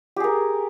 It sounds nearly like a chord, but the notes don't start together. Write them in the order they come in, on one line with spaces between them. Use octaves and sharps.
G4 G#4 A#4